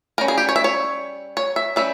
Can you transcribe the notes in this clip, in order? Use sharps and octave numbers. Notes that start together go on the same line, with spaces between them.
G3 C#4 A#4
G#4
G4
C#5
E5
C#5
C#5
E5
G3 C#4 E5